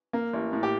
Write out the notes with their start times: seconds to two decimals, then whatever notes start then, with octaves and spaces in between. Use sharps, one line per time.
0.13 A#3
0.33 A1
0.53 A2
0.63 G4